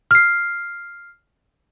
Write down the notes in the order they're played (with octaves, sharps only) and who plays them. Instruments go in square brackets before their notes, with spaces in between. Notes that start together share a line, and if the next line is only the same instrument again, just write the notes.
[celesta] F6 C7